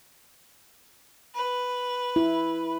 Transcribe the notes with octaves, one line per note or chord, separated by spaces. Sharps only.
B4
E4